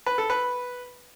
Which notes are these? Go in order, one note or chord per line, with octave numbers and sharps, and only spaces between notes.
B4
A4
B4